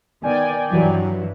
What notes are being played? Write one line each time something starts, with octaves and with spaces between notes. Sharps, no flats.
D#3 B3 D5 G5 G#5
G2 E3 F#3